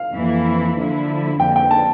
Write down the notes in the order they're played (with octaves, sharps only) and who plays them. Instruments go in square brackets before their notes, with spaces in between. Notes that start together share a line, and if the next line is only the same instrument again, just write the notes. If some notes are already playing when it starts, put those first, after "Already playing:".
Already playing: [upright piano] F5
[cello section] F2 E3 A#3 E4
D3 F3 A#3 E4
[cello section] F2 D3 F3 A#3 [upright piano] G5
[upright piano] G5
A5